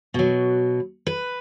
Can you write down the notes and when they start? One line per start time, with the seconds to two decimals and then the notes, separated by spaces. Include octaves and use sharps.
0.14 B2 F#3
1.07 B4